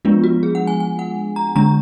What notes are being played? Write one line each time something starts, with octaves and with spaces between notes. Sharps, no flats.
F3 G#3 B3 D4 F4
F#4
G#4
F#5
G#5
G#5
F#5
A#5
D3 G#3 D4 A#5